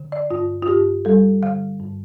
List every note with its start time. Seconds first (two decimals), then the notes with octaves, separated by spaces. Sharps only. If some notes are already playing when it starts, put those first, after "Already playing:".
Already playing: D3
0.12 D5
0.31 G2 F4
0.62 F4
0.68 G2 G4
1.05 G3 A4
1.43 D3 F5
1.79 G2